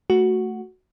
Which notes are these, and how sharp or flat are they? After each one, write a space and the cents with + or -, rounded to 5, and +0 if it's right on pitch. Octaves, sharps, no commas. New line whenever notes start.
A3 +0 F#4 +0